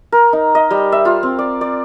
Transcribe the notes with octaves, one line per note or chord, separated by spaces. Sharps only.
A#4
D#4
D#5
G3
E5
F4
C4
D5
D5